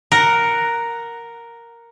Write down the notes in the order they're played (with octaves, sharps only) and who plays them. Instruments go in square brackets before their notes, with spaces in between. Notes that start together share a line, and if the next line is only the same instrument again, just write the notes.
[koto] A#4 F#5